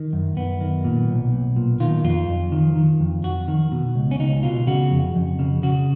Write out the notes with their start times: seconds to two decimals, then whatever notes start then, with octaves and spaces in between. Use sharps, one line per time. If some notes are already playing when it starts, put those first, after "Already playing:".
Already playing: D#3
0.13 F#2
0.36 F#2 B3
0.61 D#3
0.84 A#2
1.08 B1
1.32 B1
1.56 A#2
1.80 D#3 F4
2.04 F2 F4
2.28 F2
2.52 D#3
2.76 D#3
3.00 F2
3.24 F2 F#4
3.48 D#3
3.72 B2
3.96 C#2
4.11 C#4
4.19 C#2 D#4
4.43 B2 F4
4.67 C#3 F#4
4.91 F2
5.15 F2
5.39 C#3
5.63 C#3 F#4